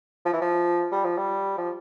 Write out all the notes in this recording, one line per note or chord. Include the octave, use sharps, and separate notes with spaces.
F3
E3
F3
G3
F3
G3
F3